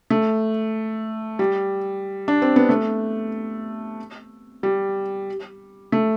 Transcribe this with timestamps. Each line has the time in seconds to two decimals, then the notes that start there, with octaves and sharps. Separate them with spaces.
0.10 A3
1.39 G3
2.28 D4
2.42 C4
2.56 B3
2.69 A3
4.63 G3
5.92 A3